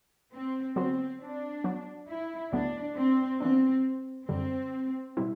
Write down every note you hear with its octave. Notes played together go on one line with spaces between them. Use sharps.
C4
D3 F#3 B3 C4 F#4 C5
D4
F#3 B3 F#4
E4
D2 D3 F#3 B3 D4
C4
E3 B3 C4 D4
F#2 D3 G3 C4
B2 G3 C4 E4